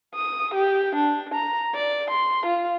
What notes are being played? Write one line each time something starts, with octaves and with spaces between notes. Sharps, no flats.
D#6
G4
D4
A#5
D5
C6
F4